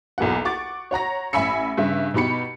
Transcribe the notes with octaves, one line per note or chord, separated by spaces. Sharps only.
B1 E2 A#3 F#5
F#5 C#6 D6 A6
C#5 F#5 A#5 A#6
A1 E5 G#5 B5 E6 C#7
G2 C#3 E5
B2 D#4 G4 B5 C#7